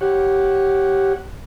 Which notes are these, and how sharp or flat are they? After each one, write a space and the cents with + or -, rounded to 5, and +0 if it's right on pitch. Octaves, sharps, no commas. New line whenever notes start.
G4 -15 C#5 -15 F#5 +0